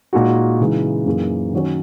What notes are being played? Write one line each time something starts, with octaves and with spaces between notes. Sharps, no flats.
A#2 G#3 D#4 F#4
C#3 E3 G#3 D#4
F#2 E3 A#3 D#4 G#4
D#3 F#3 C#4